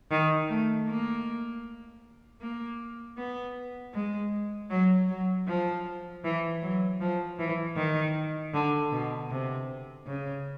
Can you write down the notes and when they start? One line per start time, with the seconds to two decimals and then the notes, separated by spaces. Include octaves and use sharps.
0.11 D#3
0.49 A3
0.88 A#3
2.41 A#3
3.18 B3
3.94 G#3
4.70 F#3
5.08 F#3
5.47 F3
6.24 E3
6.62 F#3
7.01 F3
7.39 E3
7.76 D#3
8.54 D3
8.92 B2
9.30 C3
10.07 C#3